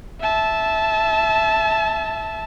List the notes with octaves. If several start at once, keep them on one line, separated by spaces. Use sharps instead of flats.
E5 A5